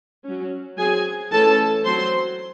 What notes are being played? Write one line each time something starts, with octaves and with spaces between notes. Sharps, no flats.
F#3 C#4
F#3 C4 G#4 G#5
E3 A3 C#4 A4 A5
F#3 C4 C5 C6